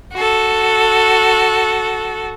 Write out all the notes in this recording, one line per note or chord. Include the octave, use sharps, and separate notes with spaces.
F#4 A4